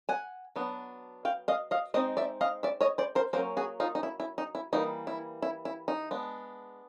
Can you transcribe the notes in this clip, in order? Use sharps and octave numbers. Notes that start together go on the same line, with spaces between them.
F#5 G#5
F#3 B3 D4
F5 G5
D#5 F5
D#5 F5
G#3 C4 D#4 D#5
D5 E5
D#5 F5
D5 E5
C#5 D#5
C5 D5
A#4 C5
F#3 A#3 C#4 A#4 C5
F#4 G#4
D#4 F4
D#4
E4
E4
D#4
E4
E3 G3 A#3 D#4
E4
E4
E4
D#4
G#3 B3 D4